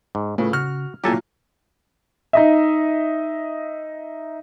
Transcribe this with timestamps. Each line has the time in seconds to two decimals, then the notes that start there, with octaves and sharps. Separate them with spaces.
0.15 G#2
0.38 A2 C#3 A3 F4 B4
0.53 C#3 F#4 F6
1.04 A#2 F#3 E4 F4 G4 A4 G#5
2.33 D#4 D#5 E5